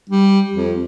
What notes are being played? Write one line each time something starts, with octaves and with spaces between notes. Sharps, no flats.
G3
F2